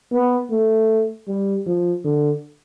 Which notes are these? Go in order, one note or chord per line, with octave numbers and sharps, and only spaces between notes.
B3
A3
G3
F3
D3